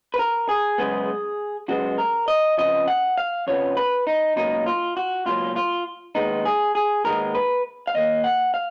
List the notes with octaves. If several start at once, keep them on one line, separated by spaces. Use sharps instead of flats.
B4
A#4
G#4
F#2 C#3 G#3 B3
F#2 C#3 G#3 B3 F#4
A#4
D#5
F2 C#3 F3 B3 D#5
F#5
F5
F2 C#3 F3 B3 C#5
B4
D#4
C#2 B2 F#3 A#3 D#4
F4
F#4
C#2 B2 F#3 A#3 F4
F4
D#2 D#3 G#3 B3 D#4
G#4
G#4
D#2 D#3 G#3 B3 A#4
B4
F5
D#2 D#3 A#3 D#5
F#5
F5